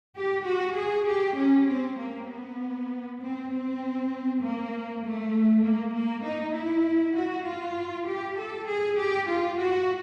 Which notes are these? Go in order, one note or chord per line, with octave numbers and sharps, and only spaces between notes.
G4
F#4
G#4
G4
C#4
C4
A#3
B3
C4
C4
A#3
A3
A#3
A#3
D#4
E4
F#4
F4
G4
A4
G#4
G4
F4
F#4